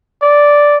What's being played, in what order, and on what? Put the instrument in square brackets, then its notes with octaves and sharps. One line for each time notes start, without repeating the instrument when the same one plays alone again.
[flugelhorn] D5